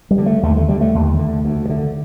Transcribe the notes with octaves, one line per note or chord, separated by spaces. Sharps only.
G3
D3
A3
D#2 A3
A3
D3 G3
A3
D#2
D3
D2
D3